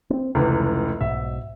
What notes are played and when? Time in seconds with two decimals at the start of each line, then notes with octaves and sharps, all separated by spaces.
0.10 B3 C4
0.35 F1 C#2 C#3 E3
1.01 B1 G#2 B2 E5